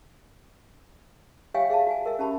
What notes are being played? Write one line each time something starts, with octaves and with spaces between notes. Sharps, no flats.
G4 C#5 E5 F5 G5 G#5
G#4 E5 F5 A5
F#4 G#5
A#4 E5
C#4 G4 A5 B5